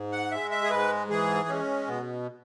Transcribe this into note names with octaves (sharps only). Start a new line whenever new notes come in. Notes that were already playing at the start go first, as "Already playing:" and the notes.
Already playing: G#2
F#5
G#3 E5
E5
G#4
G#2 B4
E3 G#4
G#3 C#4
B2 B3